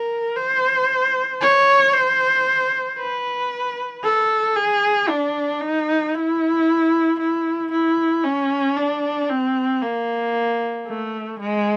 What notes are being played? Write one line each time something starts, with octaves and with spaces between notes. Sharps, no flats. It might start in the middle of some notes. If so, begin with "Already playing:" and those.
Already playing: A#4
C5
C#5
C5
B4
A4
G#4
D4
D#4
E4
E4
E4
C#4
D4
C4
A#3
A3
G#3